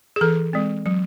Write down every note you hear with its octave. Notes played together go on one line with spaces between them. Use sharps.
G#4
E3 A4
G#3 C4
F#3